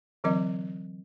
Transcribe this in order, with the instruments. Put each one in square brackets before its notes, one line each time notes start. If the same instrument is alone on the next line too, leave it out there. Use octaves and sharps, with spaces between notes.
[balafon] D3 E3 F#3 C4 A#4 D#5